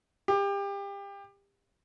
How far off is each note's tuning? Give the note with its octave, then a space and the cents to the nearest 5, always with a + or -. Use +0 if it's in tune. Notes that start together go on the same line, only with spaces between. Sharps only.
G4 +30